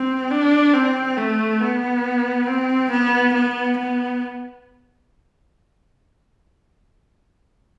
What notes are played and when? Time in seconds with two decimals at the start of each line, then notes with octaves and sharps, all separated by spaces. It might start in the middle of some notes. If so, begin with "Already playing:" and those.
Already playing: C4
0.31 D4
0.74 C4
1.17 A3
1.60 B3
2.47 C4
2.91 B3
3.33 B3
3.78 B3